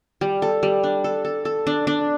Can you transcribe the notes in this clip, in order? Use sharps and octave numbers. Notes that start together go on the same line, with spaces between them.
G3
A4
G3
D4
A4
A4
A4
D4
D4